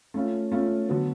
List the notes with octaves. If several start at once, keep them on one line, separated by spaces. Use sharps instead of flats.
A3 C#4 F4
A3 C#4 F4
D3 F#3 B3